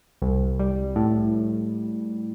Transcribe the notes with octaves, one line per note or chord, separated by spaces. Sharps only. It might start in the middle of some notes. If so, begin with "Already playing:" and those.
C2
G3
A2